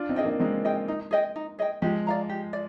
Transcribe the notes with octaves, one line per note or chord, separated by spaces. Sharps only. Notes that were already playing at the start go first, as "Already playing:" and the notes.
Already playing: D4 F4
C4 D#4
G#4 D#5 G5
A#3 D4
G#3 C4 D#4
G#4 D#5 G5
D#4
G#4 D#5 G5
D#4
G#4 D#5 G5
F3 G#3 G4
D5 F5 A#5
G4
D5